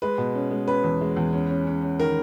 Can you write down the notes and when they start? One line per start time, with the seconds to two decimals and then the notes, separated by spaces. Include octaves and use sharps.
0.02 G#3 B4
0.18 B2
0.35 C#4
0.51 G#3
0.67 C#4 B4
0.84 E2
1.01 G#3
1.17 E2
1.33 C#4
1.50 C#4
1.67 C#4
1.82 C#4
2.00 D#3 A#4